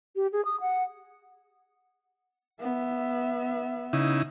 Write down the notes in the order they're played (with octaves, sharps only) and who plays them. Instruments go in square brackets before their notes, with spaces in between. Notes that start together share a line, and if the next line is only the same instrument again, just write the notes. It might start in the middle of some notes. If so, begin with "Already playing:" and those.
[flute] G4
G#4
D#6
F#5
[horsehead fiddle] B3 E5
[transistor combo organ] C#3 D#4 E4